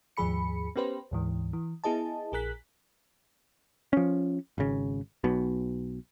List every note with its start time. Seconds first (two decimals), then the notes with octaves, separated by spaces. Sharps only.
0.17 D#2 G#2 F3 G#4 B5 C#7
0.76 B3 C#4 G4 B4 C5
1.11 D2 G#2 E3
1.53 E3
1.84 B3 E4 G#4 D#5 A5
2.32 A#1 G#4 A#4 F#6 B6
3.93 F3 C#4
4.58 G#1 C#3
5.24 B1 B2